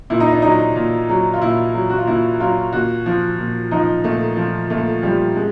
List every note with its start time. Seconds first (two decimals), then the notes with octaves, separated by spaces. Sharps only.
0.10 A#2 E4
0.20 D#4
0.31 D4
0.42 F#3 D#4
0.76 A#2
1.09 F#3
1.34 F4
1.42 A#2 E4
1.74 F#3
1.90 F#4
1.98 F4
2.07 A#2 E4
2.40 F#3 F4
2.73 A#2 F#4
3.06 F3
3.39 A#2
3.71 F3 D#4
4.04 A#2 A3
4.37 F3
4.70 A#2 A3
5.03 F3 G3
5.36 G#3